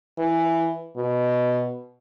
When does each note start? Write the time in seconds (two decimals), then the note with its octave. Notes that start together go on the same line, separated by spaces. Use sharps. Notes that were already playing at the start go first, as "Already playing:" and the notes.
0.18 E3
0.97 B2